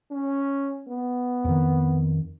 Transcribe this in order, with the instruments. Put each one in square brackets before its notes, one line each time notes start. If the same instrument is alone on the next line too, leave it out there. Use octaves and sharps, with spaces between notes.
[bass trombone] C#4
B3
[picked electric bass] F2 D#3